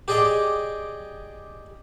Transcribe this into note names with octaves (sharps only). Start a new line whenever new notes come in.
G4 G#4 D5 D#5 G5